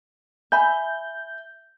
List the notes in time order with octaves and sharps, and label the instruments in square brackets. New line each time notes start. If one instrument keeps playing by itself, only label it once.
[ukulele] E5 G#5 B5 [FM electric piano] G6